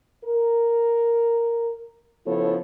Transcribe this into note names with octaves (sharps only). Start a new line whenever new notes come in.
A#4
C#3 F3 B3 E4 A4 C#5